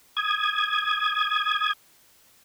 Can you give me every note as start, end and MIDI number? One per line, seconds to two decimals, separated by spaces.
0.17 1.73 87
0.17 1.73 92